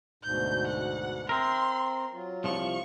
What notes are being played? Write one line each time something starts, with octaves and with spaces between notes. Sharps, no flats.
D2 G#2 B2 G6
F#5
C4 A#4 E5 C6
F#3 F4
C2 F3 C#6